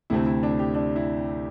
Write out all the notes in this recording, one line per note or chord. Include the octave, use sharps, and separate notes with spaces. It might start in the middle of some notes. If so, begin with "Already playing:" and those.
D2 C3 A3 C4 E4
E4
D4
G4
D4
E4